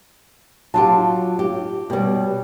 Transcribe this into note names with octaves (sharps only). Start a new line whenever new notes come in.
F#3 F4 G4 A5
G4
B2 G3 G4 C#5